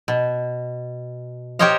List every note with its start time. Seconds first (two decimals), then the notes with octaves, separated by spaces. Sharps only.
0.08 B2
1.59 G4 A#4 C5 C#5 D#5 F5